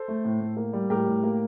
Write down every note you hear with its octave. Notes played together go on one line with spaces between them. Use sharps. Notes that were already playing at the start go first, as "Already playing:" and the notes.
Already playing: A4 C5
A3
A2
A2
A#3
G3
A2 G4 A#4
A2
A#3